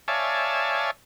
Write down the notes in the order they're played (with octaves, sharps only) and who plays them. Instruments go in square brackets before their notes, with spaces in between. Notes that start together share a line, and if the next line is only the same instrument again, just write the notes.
[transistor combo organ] C#5 D5 E5 F5 G#5 A5